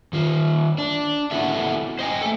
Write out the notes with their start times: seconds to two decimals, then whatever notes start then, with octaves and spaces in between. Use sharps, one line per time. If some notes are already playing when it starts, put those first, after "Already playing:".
0.13 D#3 F4
0.78 D4
1.31 B3 C#4 E4 F#4 A4 E5
1.99 C5 D#5 G5 G#5
2.22 A3 A4